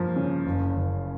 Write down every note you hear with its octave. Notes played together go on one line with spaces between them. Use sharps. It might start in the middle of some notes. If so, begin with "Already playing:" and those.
Already playing: G2 F3 A#3
C#3
F#1
F#1